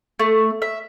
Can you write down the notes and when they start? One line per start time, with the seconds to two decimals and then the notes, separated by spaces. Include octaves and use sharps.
0.19 A3
0.62 E5